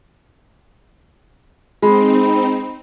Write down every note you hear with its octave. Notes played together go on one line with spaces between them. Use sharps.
G#3 C4 D#4 B5